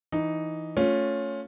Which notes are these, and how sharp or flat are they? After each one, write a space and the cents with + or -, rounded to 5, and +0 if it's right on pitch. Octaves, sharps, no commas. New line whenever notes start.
E3 +0 D#4 +0
A3 +0 C#4 +0 F4 +15